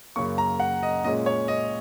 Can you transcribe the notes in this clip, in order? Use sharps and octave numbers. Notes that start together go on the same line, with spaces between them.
F#2 C#3 A#3 C#6
A#5
F#5
D#5
A#2 G#3 C#4 D#5
C#5
D#5